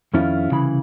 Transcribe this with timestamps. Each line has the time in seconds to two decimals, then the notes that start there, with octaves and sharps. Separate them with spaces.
0.14 F2 D#3 C#4 E4 F4
0.51 C2 C#3 E3 B5